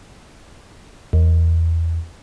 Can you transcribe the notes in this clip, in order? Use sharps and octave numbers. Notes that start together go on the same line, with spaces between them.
E2